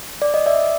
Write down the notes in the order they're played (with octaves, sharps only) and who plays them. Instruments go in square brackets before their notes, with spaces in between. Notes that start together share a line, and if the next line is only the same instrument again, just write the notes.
[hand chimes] D5
D#5
D5 E5